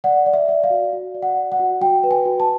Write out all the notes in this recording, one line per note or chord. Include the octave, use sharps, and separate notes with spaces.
D5 F#5
D5
E5
D5
F5
F#4
F#4
D5
F#5
D5
F#5
F#4
F#4 G5
B4
G#5
F#4
A5